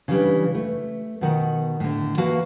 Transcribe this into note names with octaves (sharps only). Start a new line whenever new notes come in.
C#3 E3 G3 D4
A3
B2 D#3 F#5
A2 D3
E3 A#3 F#4 F5 A5